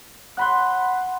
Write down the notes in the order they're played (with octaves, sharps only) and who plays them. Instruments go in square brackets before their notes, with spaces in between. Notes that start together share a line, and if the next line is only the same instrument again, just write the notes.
[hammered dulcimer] F#5 B5 C6